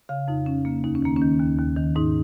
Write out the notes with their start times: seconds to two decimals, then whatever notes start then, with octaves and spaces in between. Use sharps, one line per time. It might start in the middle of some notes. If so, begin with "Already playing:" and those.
0.09 C#3 F5
0.28 F2 D#4
0.46 F2 C#4
0.65 C#3 A#3
0.84 D#2 D#4
0.95 C#4
1.02 D#3 A#3
1.16 C#4
1.21 D#3
1.39 D#2
1.58 D#2
1.77 D#3
1.95 G#2 D#4